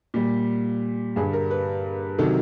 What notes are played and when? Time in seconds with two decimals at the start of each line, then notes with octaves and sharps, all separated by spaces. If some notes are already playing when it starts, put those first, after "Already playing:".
0.14 A#2 G3
1.16 G2 D3 G3 G#4
1.33 A#4
1.51 B4
2.18 C3 D#3 F#3 A4